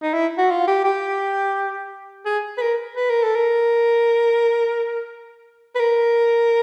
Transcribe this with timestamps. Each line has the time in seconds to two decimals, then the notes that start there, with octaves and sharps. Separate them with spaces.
0.02 D#4
0.14 E4
0.38 F#4
0.50 F4
0.67 G4
0.84 G4
2.26 G#4
2.58 B4
2.61 A#4
2.96 B4
3.10 A#4
3.23 A4
3.35 A#4
5.75 B4
5.80 A#4